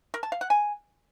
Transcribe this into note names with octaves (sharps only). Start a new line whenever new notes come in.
A#4
A5
F5
F#5
G#5